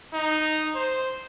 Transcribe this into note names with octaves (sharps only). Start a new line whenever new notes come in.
D#4
C5